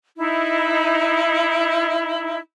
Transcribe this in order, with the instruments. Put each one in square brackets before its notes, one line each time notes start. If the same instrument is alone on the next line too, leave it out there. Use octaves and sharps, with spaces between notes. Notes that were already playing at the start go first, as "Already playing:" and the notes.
[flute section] D#4 E4